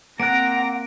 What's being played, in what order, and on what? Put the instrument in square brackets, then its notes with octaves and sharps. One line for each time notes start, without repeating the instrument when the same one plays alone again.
[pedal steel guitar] A#3 F#6 [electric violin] C4 A#5 [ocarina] F#5 [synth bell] D7